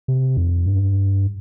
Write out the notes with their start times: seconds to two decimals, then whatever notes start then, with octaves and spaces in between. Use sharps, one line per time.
0.08 C3
0.37 F2
0.66 G2